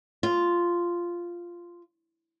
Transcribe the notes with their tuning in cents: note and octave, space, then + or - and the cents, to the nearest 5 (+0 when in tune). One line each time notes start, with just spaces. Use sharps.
F4 -5